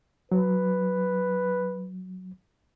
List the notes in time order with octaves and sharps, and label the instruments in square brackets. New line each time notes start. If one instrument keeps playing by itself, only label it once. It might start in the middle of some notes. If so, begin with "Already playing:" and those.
[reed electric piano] F#3 [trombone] B4